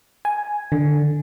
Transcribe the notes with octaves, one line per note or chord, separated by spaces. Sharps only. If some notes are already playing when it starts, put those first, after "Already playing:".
G#5
D3